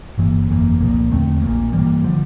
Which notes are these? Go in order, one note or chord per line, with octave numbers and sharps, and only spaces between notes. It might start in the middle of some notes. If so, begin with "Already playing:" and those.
G1 G2 E3 A#3
G1 F2 E3 A#3
C2 A#2 F3 A#3
E2 D3 A3 C4
A#1 A#2 F3 A#3
G2 E3 G3 A#3
D3 F3